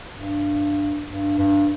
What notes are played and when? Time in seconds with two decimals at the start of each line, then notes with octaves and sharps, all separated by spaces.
0.16 G2
1.07 G2
1.38 G2